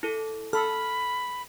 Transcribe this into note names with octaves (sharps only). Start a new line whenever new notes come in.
E4 A4
A4 B5 F6